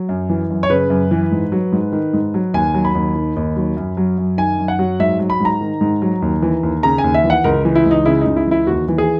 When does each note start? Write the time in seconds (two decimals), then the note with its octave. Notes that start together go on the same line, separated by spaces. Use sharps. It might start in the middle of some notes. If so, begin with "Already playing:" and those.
Already playing: F#3
0.09 F#2
0.29 E3
0.50 F#2
0.63 C#5
0.70 C#3 B4
0.90 F#2
1.11 E3
1.31 G#2
1.52 F#3
1.72 G#2
1.92 D#3
2.13 G#2
2.34 F#3
2.54 D#2 G#5
2.74 F#3
2.85 B5
2.95 D#2
3.16 D#3
3.36 D#2
3.56 F#3
3.77 F#2
3.97 F#3
4.18 F#2
4.38 D#3 G#5
4.58 F#2
4.68 F#5
4.79 F#3
4.99 G#2 E5
5.19 F#3
5.30 B5
5.40 G#2 A#5
5.61 D#3
5.81 G#2
6.02 F#3
6.22 D#2
6.42 E3
6.63 D#2
6.83 C#3 A#5
6.98 G#5
7.04 D#2
7.14 E5
7.24 E3
7.30 F#5
7.44 C#2 A#4
7.65 E3
7.75 E4
7.85 C#2
7.91 D#4
8.06 C#3 E4
8.21 C#2 D#4
8.36 E4
8.47 E3 E4
8.67 D#2 F#4
8.88 E3
8.98 G#4